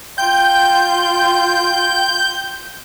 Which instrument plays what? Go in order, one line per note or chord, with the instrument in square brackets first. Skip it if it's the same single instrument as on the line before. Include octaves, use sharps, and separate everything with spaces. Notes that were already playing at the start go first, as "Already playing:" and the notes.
[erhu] F4 [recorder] G5 [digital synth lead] G6